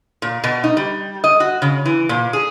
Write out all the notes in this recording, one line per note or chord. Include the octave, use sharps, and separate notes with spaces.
A#2
B2
D#4
G3
D#5
F#4
C#3
E3
A#2
G#4